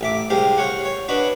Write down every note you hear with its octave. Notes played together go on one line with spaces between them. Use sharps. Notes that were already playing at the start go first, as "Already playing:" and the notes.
A1 E5 D6
C2 G#3 G4 C5 F5
C#5 F5 F#5
C#5
D4 F#4 B4 D#5